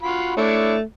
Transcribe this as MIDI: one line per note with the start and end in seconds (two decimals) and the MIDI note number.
0.03 0.33 65
0.03 0.33 66
0.03 0.33 83
0.37 0.83 57
0.37 0.75 62
0.37 0.75 64
0.37 0.75 73